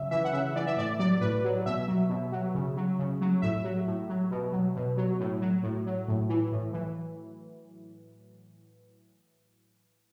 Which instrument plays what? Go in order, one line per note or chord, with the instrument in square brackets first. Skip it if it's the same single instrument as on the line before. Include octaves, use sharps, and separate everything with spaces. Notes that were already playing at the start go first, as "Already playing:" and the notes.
Already playing: [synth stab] C#3 F#3 E5
E3 E5
F#5
C#3 E5
E3 D5
E5
A2 D5
F#3 D5
A2 B4
F#3
B2 E5
F#3
B2
F#3
C#3
F#3
C#3
F#3
A2 E5
F#3
A2
F#3
B2
F#3
B2
F#3
A2
F#3
A2
F#3
A2
E3
A2
E3